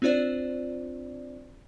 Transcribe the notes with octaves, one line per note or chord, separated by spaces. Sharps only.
C4 D4 F4 C5 D5